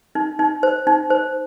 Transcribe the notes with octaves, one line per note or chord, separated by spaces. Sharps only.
D#4
D#4
C5
D#4
C5